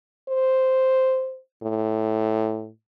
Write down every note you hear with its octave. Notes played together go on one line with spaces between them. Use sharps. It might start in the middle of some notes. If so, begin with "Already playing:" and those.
C5
A2